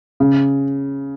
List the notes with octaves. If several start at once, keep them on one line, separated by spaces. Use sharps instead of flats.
C#3